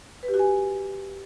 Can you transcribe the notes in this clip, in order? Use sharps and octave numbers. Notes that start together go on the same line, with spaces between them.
B4
G4
F#4
G#5